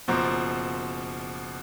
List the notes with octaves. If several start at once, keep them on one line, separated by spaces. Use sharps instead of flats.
F#1 B2 F3 C5 A#5 D6